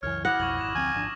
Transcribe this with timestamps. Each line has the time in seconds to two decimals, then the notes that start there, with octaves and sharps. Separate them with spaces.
0.03 C#2 F#2 E3 C#5 F6
0.25 E4 F#5 D6 D#6 A#6
0.40 B1 F2 C#6 G#6 F#7
0.61 G#1 E7
0.75 D2 F3 C4 G#5
0.95 G#1 F3 D4